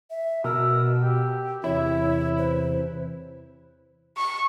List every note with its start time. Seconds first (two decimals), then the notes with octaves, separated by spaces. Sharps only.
0.10 E5
0.44 B2 A#4 E6
1.01 G4
1.64 E2 C3 E3 E4 C#5 E5
2.38 B4 C5
4.17 C#6